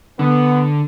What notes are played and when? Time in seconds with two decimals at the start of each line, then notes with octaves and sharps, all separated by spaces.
0.19 D3 B3